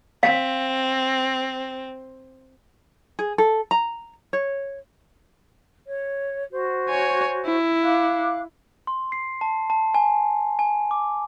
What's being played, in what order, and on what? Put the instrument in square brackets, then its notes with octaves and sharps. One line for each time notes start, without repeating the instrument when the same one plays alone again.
[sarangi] C4 [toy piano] F5
[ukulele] G#4
A4
A#5
C#5
[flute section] C#5
F#4 C5
[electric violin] C#5 G#5
E4
[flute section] F5 D6 F#6
[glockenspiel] C6
C7
A5
A5
G#5
G#5
D6